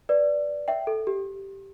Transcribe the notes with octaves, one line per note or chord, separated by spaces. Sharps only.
B4 D5
E5 G5
A4
G4